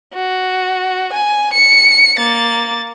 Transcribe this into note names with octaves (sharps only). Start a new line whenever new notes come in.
F#4
G#5
C#7
A#3 A6